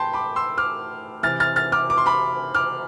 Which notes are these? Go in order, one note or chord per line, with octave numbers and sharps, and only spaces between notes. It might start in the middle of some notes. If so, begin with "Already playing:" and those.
Already playing: A2 G5 A5 B5 C6 G6
B5 D6
C6 E6
D6 F6
C3 E3 F6 A6
F6 A6
F6 A6
D6 F6
D6
C6
B5 D6
D6 F6